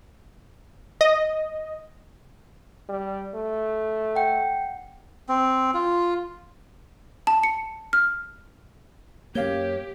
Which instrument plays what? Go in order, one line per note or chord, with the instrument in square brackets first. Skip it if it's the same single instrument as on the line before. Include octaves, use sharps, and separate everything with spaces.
[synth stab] D#5
[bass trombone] G3
A3
[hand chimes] F#5 G5
[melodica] C4
F4
[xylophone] A5
C#7
F6
[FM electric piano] F#2 F5 G6 [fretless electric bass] A#3 [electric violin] G4 [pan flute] C#5